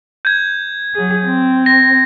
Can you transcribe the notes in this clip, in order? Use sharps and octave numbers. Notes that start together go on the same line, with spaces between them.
G6 G#6
F#3 G#4
C4
A#6